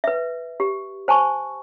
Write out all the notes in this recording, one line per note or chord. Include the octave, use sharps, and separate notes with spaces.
B4 E5
G4
C5 G#5 A5 C#6